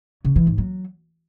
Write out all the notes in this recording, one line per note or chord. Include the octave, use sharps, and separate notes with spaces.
C#3
E3
G#2
F#3